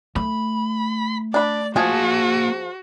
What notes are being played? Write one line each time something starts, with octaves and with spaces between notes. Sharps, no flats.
A3 B5
D4 D5 B5
F3 A#3 F#4 G#4 G#5 A5